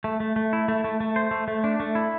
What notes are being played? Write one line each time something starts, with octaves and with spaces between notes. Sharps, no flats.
A3
A3
A3
E4
A3
A3
A3
C5
A3
A3
D4
A3
E4